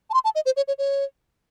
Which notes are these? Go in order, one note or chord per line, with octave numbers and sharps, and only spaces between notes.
A5
C6
A5
D#5
C5
C#5
C#5
C#5